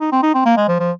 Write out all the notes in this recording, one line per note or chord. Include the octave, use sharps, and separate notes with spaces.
D#4
C4
D#4
C4
A#3
G#3
F3
F3